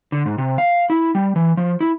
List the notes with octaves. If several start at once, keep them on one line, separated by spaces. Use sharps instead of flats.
D3
G#2
C3
F5
E4
G3
E3
F3
E4